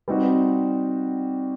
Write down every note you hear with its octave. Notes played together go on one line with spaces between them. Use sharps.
G3 C4 D#4 F#4